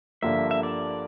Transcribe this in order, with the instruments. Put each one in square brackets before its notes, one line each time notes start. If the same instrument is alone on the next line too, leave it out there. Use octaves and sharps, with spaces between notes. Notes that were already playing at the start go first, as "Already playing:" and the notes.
[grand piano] G1 G2 D3 F3 A#3 [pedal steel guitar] E5
[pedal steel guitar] E5
D5